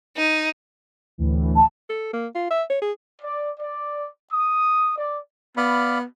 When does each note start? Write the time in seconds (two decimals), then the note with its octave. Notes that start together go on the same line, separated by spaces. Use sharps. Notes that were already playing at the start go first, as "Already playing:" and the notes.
0.17 D#4
1.18 D2 A2 E3
1.56 A5
1.89 A4
2.13 A#3
2.35 F4
2.50 E5
2.70 C#5
2.82 G#4
3.22 D5
3.59 D5
4.31 D#6
4.97 D5
5.57 B3 D5 F5 B5